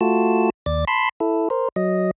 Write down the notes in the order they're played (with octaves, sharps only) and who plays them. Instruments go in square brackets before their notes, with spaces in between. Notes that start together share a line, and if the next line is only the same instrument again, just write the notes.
[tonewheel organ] A3 F4 F#4 A5
D#2 D5 A6
A5 B5 C6
E4 A4
A#4 C5
F#3 D#5